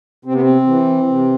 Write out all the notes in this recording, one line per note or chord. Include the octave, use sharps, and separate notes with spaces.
C3 C4
B3
C4
E3
C3